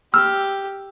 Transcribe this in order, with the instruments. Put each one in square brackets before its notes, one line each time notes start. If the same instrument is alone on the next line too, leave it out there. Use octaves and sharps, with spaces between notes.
[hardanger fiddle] G4 [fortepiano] E6 F6